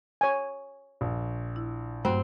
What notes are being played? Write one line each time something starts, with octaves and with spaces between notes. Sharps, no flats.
C#5 G#5
A#1
E4
G2 F#3 A3 C4 F#6